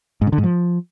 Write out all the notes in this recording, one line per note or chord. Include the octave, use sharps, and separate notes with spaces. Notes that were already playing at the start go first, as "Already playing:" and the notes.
G#2
C#3
D3
G#2
F3